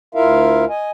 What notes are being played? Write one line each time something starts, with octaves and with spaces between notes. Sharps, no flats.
D2 E4 F4 A#4 E5 F5
D#5 G#5